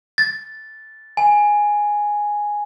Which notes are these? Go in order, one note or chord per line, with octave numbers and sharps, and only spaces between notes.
A6
G#5